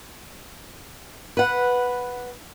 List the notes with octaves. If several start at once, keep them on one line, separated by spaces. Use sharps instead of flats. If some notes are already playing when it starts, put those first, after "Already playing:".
B4 F#5